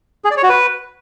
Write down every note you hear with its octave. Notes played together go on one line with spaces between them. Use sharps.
G#4
D5
C#5
F#4
B4